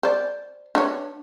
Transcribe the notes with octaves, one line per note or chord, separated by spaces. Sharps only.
C5 D5
D4 B4 C#5